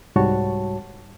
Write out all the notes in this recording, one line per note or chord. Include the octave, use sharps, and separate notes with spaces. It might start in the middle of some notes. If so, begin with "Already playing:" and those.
C2 G#2 G3 F#4 C#5 A5